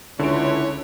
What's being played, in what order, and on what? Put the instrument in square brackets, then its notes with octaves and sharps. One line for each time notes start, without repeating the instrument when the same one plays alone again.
[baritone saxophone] C#2 [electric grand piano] D3 D7 [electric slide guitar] E4 [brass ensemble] C#5